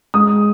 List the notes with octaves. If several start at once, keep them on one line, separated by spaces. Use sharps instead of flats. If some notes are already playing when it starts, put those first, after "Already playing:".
G#3 D#6